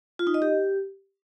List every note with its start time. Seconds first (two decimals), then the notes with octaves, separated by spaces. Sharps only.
0.19 F4
0.27 D#4
0.34 D#5
0.42 G4